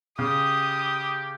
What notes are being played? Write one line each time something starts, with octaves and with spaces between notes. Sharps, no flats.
C#3 G4 D#6